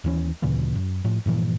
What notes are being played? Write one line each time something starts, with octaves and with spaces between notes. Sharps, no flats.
D#2 E3 C#4
D2 A#2 C#3 E3
F#2
A2 F3
G2 A#2 E3 F3